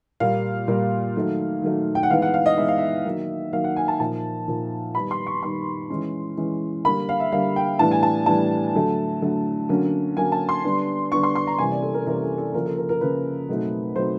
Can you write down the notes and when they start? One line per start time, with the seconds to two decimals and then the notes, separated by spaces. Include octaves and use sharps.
0.20 A#2 G3 A#3 F5
0.68 A#2 G3 A#3
1.16 D#3 F#3 A3
1.62 D#3 F#3 A3
1.95 G5
2.03 F#5
2.10 E3 G#3 B3 D#4 F5
2.22 F#5
2.34 F5
2.46 D#5
2.57 E3 G#3 B3 D#4 E5
2.68 F5
2.78 E5
3.05 D#3 F#3 A#3
3.53 D#3 F#3 A#3 F5
3.64 F#5
3.76 G#5
3.88 A5
4.00 A#2 F3 A#3 D#4 A5
4.48 A#2 F3 A#3 D#4
4.95 D#3 G3 B3 D#4 B5
5.11 C6
5.27 C#6
5.42 D#3 G3 B3 D#4 C6
5.90 E3 G#3 C#4
6.37 E3 G#3 C#4
6.85 D3 G3 A#3 B5
7.09 F5
7.20 E5
7.32 D3 G3 A#3 F5
7.56 G5
7.79 A2 E3 G3 B3 D4 A5
7.91 G#5
8.03 A5
8.26 A2 E3 G3 B3 D4 A5
8.74 D3 F#3 A3
9.22 D3 F#3 A3
9.69 D3 F#3 A#3 C#4
10.16 D3 F#3 A#3 C#4 G#5
10.32 A5
10.49 C6
10.64 D3 G3 B3 D4
11.12 D3 G3 B3 D4 C#6
11.23 C6
11.35 C6
11.47 A#5
11.58 C3 E3 G3 A#3 C#4 G#5
11.71 D5
11.82 A4
11.94 A#4
12.06 C3 E3 G3 A#3 C#4 A#4
12.22 A4
12.38 A4
12.54 C#3 F3 A#3 A#4
12.66 A4
12.78 A#4
12.89 A#4
13.01 C#3 F3 A#3 B4
13.49 B2 F#3 A3 C4 D#4
13.96 B2 F#3 A3 C4 D#4 C5